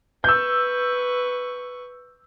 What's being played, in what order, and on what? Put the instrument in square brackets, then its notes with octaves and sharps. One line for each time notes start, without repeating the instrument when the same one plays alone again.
[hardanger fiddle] B4 C#6 [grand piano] E6 G6